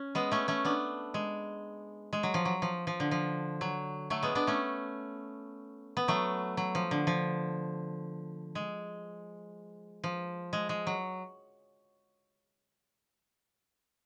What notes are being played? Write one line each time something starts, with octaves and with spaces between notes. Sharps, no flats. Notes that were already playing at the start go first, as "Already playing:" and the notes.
Already playing: C#4
G#3 B3
A3 C#4
A3 C#4
B3 D4
G#3
G#3
F#3
F3
F#3
F3
F3
D3
F3
F#3
F#3 A3
G#3 B3
B3 D4
A3 C#4
B3
F#3 A3
F#3
F3
D3
F3
G#3
F3
G#3
G#3
F#3